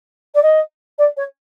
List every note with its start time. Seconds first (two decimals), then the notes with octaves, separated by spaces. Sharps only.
0.34 D5
0.42 D#5
0.98 D5
1.17 C#5